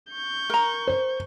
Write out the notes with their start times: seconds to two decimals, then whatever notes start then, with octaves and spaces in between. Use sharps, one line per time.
0.11 C#6 G6
0.50 A#4 A#5
0.87 C5